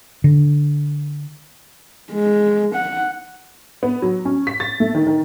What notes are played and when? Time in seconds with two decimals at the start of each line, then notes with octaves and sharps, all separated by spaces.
0.24 D3
2.13 G#3
2.75 F#5
3.83 B3
4.02 F#3
4.25 C#4
4.47 B6
4.60 A6
4.80 A3
4.95 D#3
5.07 D#3